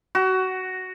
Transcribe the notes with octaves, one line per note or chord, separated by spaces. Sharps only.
F#4